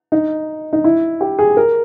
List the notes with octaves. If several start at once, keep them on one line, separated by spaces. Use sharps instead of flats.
D#4
D#4
E4
G4
G#4
A#4